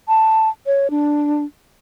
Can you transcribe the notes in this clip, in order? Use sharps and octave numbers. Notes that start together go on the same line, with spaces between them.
A5
C#5
D4